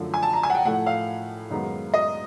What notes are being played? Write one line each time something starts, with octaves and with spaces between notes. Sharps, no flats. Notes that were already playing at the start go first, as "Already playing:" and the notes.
Already playing: F#2 D3 F3 A3
G#5
A5
A#5
G#5
F#5
G5
A2 F3 A3 F#5
F5
F#2 D#3 G#3 B3
D#5